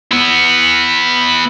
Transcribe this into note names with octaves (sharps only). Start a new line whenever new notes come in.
B3 E4